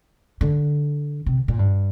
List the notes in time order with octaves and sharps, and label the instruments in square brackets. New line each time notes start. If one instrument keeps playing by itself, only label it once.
[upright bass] D3
C3
A#2
G2